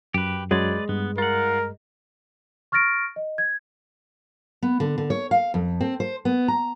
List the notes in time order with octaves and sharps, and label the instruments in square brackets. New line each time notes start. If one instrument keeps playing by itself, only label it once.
[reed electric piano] F#2 [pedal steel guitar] G4 B4
[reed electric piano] F#2 F#3 G#6 [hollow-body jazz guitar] G#3 [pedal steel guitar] B4 D5
[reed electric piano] G2 [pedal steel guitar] B3
[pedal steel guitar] F4 F#5 [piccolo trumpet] A#4
[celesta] C#6 F6 A6 A#6 D7
D#5
G#6
[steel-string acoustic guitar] B3
D3
D3
C#5
F5
F2
C4
C5
B3
A#5